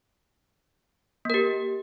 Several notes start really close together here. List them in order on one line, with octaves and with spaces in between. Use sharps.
A#3 A#4 G4